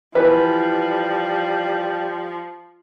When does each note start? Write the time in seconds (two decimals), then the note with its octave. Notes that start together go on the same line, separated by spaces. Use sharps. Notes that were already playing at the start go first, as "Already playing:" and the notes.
0.15 E3 F3 G3 B4